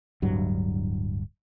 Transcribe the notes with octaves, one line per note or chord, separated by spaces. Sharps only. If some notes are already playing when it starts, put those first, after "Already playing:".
D1 G2 F#3